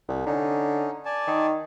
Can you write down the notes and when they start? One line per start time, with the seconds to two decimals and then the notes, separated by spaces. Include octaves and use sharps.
0.08 C2
0.26 D3 C#4 D#4
1.05 D5 G#5 A5
1.28 D#3